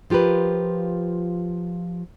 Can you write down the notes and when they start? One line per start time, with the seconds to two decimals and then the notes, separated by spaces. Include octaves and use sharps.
0.10 F3 F4 G4 A#4 B4